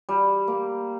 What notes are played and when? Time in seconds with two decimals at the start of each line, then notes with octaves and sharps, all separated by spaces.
0.09 G3
0.48 A#3